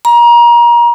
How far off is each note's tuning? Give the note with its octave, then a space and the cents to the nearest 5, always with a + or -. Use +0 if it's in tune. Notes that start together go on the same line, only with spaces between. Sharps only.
A#5 +30